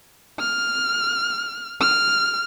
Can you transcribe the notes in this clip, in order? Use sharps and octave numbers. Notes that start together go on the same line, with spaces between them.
F6
F6